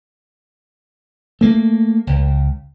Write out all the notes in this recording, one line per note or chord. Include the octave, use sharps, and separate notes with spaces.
A3 A#3
C#2